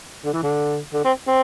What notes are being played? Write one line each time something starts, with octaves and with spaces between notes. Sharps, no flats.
D3
E3
D3
D3
C4
C4